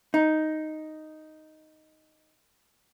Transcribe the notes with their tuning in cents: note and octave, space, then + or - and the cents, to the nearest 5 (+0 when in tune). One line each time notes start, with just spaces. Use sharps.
D#4 +0